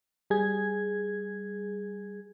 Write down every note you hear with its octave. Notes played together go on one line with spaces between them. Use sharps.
G3 G#4 G#6